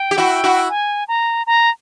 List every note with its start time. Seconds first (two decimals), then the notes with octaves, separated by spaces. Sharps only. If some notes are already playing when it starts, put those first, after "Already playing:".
Already playing: G5
0.11 G4
0.18 E4 F#4
0.44 E4 F#4
0.69 G#5
1.08 A#5
1.46 A#5